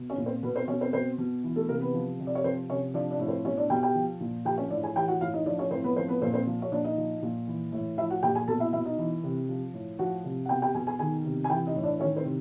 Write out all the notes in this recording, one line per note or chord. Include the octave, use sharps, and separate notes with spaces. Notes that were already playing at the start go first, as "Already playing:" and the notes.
Already playing: B2
C#4 C#5
A#2
C4 C5
B2 B3 B4
C4 C5
B2 C#4 C#5
C4 C5
B2 C4 C5
B2
E3
A3 A4
C3 A#3 A#4
B3 B4
F3
C3
D5
C#5
F3 C4 C5
C3 C#4 C#5
F3 D4 D5
D4 D5
A2
C4 C5
B2 C#4 C#5
D4 D5
B2 G4 G5
G4 G5
F3
A#2
F3 G4 G5
C#4 C#5
A2 D4 D5
G#4 G#5
E3 G4 G5
F#4 F#5
A2 F4 F5
D#4 D#5
F3 D4 D5
C#4 C#5
A2 C4 C5
B3 B4
F3 C4 C5
B3 B4
A#2 C4 C5
C4 C5
F3
C#5
A#2 D4 D5
D#4 D#5
F3
A#2
E3
A2
F3 E4 E5
F#4 F#5
A#2 G4 G5
G#4 G#5
B2 A4 A5
E4 E5
B2 E4 E5
D#4 D#5
E3
C3
F3
A2
F3 F#4 F#5
C3
F#5
B2 G4 G5
G4 G5
B2 G#4 G#5
G#4 G#5
D#3 G#4 G#5
C3
G#5
E3 G4 G5
D#4 D#5
A2
D4 D5
D#3 C#4 C#5
C4 C5
C3